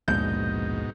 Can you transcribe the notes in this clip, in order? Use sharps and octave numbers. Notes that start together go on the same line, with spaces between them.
A#1 D#2 G#2 B2 G#3 D#4 G6